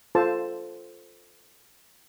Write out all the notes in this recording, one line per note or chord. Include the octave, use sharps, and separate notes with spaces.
F4 A4 C5 A5